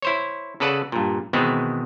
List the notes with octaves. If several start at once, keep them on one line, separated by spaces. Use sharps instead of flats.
E4 C5 C#5
C#3 A4 B4 D5 F#5 A5
G2 A#2
B2 D#3 E3 G#3 B3 C4